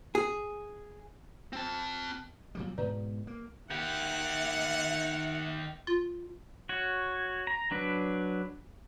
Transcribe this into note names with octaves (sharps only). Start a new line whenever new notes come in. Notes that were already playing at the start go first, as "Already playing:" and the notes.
G#4
C4 A5
A#2 F#3 G3
G#2 B2 B4 D5 A#5
A#3
D#3 G4 E5 F#5
F4
F#4 C#5
A#5
F#3 D4 B4